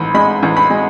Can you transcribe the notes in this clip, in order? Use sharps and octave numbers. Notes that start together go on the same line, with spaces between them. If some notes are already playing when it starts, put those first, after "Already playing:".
Already playing: A1 G#2 B5
G#3 B5
A1
B5
G#3